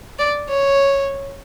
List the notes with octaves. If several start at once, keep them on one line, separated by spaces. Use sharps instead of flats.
D5
C#5